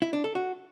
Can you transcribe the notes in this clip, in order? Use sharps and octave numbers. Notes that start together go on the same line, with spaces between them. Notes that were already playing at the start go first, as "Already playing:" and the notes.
E4
D4
A4
F#4